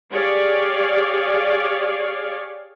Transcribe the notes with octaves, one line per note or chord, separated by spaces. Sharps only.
G4 G#4 C#5 D5 F5